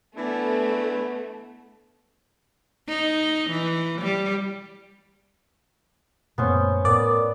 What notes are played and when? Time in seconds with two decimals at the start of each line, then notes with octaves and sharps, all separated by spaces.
0.17 E3 A3 B3 D4 E4
2.88 D#4
3.50 E3
4.01 G3
6.38 F#2 A#2 A3 B3 C#4 C5
6.85 A2 B3 A#4 D5